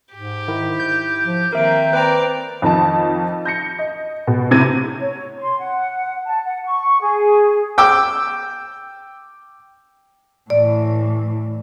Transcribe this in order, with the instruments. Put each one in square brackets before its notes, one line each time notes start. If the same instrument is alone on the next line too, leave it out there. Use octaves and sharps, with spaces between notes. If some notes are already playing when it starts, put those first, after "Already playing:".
[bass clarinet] G#2 [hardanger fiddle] G4
[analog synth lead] D#3 [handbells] E4
[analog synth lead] G6
[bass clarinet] F3
[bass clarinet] D#3 [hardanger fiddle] A#3 C4 [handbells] A#4 E5 D7
[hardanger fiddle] C4 D5 [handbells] B4 G5 A#5
[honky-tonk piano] F2 D#3 D#4 A5
G6 A#6 C#7
D#5
B2
A2 C3 G#6 D#7
[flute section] C#5
C6
F#5
A5
F#5
C#6
G#4
[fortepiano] G5 D6 E6
[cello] A2 E3 [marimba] D5